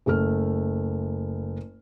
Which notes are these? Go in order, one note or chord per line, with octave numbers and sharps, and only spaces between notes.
F#1 A3 F6